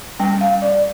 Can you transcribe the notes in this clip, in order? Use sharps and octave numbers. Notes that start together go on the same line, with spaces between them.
G3 C#4 G5
F5
D5